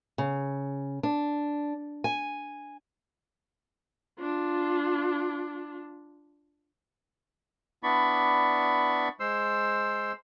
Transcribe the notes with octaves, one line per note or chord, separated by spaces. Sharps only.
C#3
D4
G#5
D4 F4
B3 D4 E4 D5 B5 C#6
G#3 C5 C6 E6